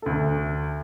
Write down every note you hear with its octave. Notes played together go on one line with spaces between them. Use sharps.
D2 A4